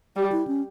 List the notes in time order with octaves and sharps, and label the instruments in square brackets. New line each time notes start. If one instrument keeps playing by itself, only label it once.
[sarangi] G3 [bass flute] G4
[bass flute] E4
C#4